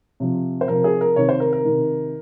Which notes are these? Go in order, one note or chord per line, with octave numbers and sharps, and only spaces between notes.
C3 F3
C5
C3 F3 A#4
G#4
A#4
C3 D#3 C#5
C5
A#4
A#4
C3 D#3